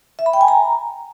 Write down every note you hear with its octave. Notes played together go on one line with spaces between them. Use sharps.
E5
B5
G5
G#5
A#5